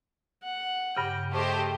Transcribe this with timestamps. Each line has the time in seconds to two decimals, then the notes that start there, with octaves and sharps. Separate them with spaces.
0.43 F#5
0.97 G2 C#3 G4 G5
1.32 A3 G4 G#4 C5 D#5